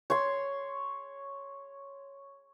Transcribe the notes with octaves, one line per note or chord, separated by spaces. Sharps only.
C#5 C6